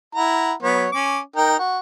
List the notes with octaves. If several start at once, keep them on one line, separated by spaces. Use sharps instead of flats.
E4 F#5 A#5
F#3 B3 C#5
C#4 D6
D#4 A#4 G5
F#4